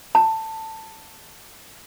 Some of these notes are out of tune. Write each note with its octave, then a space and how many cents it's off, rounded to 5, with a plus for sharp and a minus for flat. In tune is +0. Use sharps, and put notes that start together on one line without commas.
A5 +15